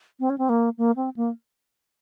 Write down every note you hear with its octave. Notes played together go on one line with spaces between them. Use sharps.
C4
C#4
C4
A#3
A#3
C4
A#3